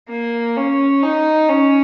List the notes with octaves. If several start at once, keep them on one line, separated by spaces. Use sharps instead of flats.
A#3
C#4
D#4
C#4